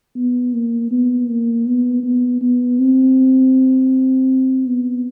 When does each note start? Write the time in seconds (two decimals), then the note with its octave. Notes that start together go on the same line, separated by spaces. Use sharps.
0.16 B3
0.53 A#3
0.91 B3
1.28 A#3
1.66 B3
2.04 B3
2.41 B3
2.80 C4
4.67 B3